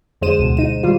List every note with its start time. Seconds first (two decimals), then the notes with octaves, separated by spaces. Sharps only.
0.21 F2 D3 G#3 C5 D#7 E7
0.39 D2 B2
0.57 D#4 D#7
0.83 D#3 G3 F4